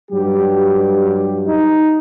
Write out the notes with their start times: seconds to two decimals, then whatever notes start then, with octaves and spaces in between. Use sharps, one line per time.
0.10 G2 F#3 G4
1.46 D#4